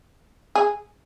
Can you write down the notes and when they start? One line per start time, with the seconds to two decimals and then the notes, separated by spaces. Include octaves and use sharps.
0.55 G#4